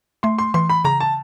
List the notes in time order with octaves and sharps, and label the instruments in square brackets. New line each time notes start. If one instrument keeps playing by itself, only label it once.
[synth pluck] A3 [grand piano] C6
[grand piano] C6
[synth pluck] E3 [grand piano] C6
[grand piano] B5
[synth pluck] C#3 [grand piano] A#5
[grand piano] A5